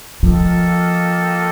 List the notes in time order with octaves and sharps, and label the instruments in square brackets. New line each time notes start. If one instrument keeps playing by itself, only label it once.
[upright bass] F3 [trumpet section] A#3 F4 A4 D#5 G5